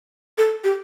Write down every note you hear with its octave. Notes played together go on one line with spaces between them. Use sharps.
A4
G4